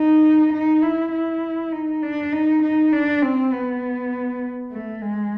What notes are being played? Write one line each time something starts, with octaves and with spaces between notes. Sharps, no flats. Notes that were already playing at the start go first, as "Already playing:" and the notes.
Already playing: D#4
D#4
E4
E4
D#4
D4
D#4
D#4
D4
C4
B3
A3
G#3